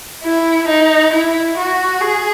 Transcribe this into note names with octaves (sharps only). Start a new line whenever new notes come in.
E4
D#4
E4
F#4
G#4